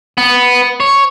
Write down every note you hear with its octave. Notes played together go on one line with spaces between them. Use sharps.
B3
C#5